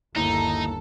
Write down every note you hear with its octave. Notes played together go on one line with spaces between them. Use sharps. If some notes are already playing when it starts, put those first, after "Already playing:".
G1 D#2 D#4 E4 A4 A#5